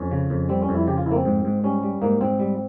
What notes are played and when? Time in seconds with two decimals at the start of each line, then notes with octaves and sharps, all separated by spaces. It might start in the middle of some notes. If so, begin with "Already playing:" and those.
Already playing: F2 C#4
0.11 C#3
0.30 F2
0.49 G3 C4
0.62 C#4
0.69 F2
0.75 E4
0.87 C#3 G4
0.97 F4
1.06 F2 E4
1.11 A#3
1.16 C4
1.25 G#2
1.45 G#2
1.64 G3 C#4
1.83 G3
2.02 G#2 A#3
2.21 G#2 C4
2.39 G3